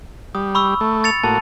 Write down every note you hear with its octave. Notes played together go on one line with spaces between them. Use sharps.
G3 D#6
B5 C#6 E6
A3
A6 C#7 F7
A2 A#3 F#4 A5